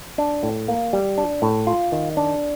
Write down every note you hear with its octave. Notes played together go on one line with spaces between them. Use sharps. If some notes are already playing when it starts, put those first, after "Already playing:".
D4
A2
A#3
G3
D4
A2
F4
D#3
D4